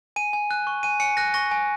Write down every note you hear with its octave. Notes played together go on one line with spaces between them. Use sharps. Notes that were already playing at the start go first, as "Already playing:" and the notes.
G#5 D#7
G#5
F#6
C#6
G#5 D#7
G#5 C#7
F#6 A#6
C#6 A#6
G#5